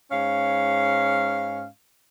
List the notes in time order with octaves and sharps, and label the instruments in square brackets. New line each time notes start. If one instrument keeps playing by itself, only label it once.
[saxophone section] G#2 C#4 F5